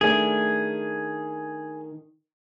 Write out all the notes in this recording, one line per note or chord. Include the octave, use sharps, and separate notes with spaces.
D#3 A3 D4 G#4